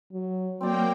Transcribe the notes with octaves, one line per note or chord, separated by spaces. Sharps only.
F#3
F#3 A#3 C4 C5 D5 G5